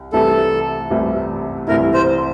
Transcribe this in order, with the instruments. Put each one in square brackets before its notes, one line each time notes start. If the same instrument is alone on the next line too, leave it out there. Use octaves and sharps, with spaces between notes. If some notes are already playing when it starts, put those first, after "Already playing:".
Already playing: [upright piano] C2
[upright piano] C2 C3 E3 A3 E4 [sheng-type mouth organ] A4
[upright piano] C2 C3 E3 A3 E4
[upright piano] C2 C3 E3 A3 E4 [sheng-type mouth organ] A#4
[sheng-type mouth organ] C5